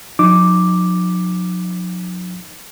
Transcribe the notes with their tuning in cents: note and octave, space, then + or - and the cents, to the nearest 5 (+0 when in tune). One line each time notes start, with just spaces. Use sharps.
F#3 -45 D#4 -15 D6 +0